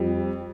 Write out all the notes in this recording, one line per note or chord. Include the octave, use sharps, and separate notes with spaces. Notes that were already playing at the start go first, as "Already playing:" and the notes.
Already playing: F2 G3